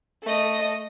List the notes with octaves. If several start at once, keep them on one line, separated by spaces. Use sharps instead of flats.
A3 D#5